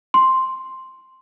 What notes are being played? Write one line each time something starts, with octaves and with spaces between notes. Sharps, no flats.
C6